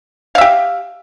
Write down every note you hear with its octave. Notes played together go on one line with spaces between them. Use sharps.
G4 E5 F5